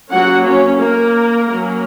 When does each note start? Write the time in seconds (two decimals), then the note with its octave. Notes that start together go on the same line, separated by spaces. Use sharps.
0.10 F#3 A#3 C#4 F#4 F#5
0.45 C#4 C#5
0.79 A#3 A#4
1.49 F#3 A#3 C#4